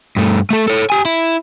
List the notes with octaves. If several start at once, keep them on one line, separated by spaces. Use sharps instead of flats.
G2 A3
A3 A4
A4 C#5
G4 G#5
E4